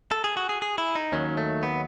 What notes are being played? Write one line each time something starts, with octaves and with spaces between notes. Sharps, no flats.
A4
G#4
F#4
G#4
G#4
E4
D#4
D#2 D#3 F#3 C#4
A3
B3